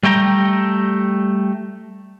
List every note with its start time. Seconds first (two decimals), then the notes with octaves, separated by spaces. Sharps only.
0.03 G3 A3 G5 A#5